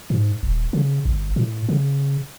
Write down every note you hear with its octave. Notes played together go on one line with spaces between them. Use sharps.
G#2
D#1
C#3
G1
A2
C#3